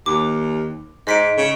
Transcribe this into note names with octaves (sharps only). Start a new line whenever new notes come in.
D#2 D6
G#2 D#5 B6 D7
C#3